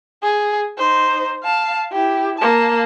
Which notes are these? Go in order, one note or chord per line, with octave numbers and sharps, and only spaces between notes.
G#4
D#4 C5
F5 A5
E4 G4
A#3 A5